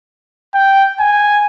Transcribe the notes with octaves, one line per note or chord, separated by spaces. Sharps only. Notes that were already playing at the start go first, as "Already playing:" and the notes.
G5
G#5